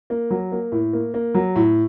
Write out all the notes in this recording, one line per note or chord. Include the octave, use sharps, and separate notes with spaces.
A#3
F#3
A#3
A2
A#3
A#3
F#3
A2